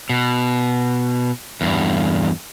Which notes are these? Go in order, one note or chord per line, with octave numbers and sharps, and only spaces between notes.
B2
E2 G2